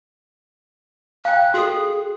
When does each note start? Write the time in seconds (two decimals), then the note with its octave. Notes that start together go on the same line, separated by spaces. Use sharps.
1.25 F5 G5 F#6
1.54 F#4 G#4 A4